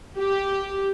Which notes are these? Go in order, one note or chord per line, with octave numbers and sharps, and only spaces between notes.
G4